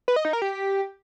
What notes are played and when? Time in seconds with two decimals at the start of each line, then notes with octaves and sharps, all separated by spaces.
0.08 B4
0.16 D#5
0.25 D#4
0.33 A#4
0.42 G4